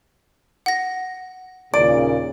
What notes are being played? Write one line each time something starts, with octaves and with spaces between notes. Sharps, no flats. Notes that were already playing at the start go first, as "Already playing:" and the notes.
F#5 A#6
D#2 A#2 C#3 D5 D7